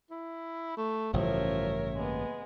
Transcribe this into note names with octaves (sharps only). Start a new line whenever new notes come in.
E4
A3
A1 G2 C#3 F3 A#4 C#5 E5
G#3 A#3 B3